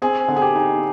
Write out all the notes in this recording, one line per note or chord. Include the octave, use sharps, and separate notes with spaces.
C4 G#4
D3
G#4
G4
D#4